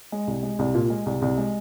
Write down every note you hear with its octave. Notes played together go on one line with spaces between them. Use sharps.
G#3
C2
G#3
C2
A#2
G#3
C2
C2
G#3